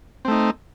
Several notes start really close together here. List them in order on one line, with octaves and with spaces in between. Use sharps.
C4 A3 D#4